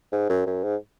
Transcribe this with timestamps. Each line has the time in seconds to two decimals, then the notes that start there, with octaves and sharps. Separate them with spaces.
0.12 G#2
0.30 F#2
0.47 F#2
0.64 G#2